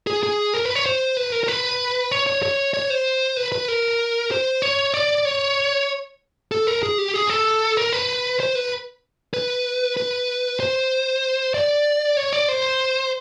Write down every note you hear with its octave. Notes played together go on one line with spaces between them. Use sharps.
G#4
G#4
A#4
B4
C#5
C5
B4
A#4
A#4
B4
C#5
C#5
C#5
C#5
C5
B4
B4
A#4
C5
C#5
D5
C#5
A4
A#4
G#4
G4
G#4
A4
A#4
B4
C5
B4
B4
B4
C5
D5
C#5
D5
C5